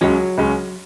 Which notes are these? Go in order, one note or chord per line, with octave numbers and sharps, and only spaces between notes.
C#2 C#3 F#3 G#3 C#4
C#2 C#3 G#3 C#4